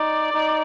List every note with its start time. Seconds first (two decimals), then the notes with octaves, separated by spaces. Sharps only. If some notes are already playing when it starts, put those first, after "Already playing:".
Already playing: D#4 D5
0.34 D#4